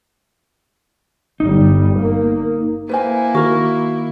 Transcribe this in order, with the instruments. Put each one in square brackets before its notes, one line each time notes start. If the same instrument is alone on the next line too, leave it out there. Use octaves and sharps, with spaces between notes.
[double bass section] G1 G3 [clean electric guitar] D#4
[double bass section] A#3
[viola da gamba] A#3 E4 [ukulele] B4 C5 G#5
[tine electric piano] D#3 [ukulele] F#4 A#4